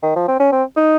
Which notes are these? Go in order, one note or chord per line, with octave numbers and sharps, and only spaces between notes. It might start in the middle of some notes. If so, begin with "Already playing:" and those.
D#3
F3
C4
C#4
C4
D#4